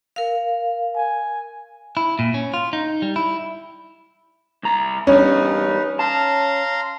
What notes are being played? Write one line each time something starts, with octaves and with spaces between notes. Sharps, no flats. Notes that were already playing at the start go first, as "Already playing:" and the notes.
A#4 F5
G#5
E4
A#2
C#4
F4
D#4
G3
E4
C2 A#5
E2 G2 G3 C#4 D#4 B4
F5 A5 A#5 C6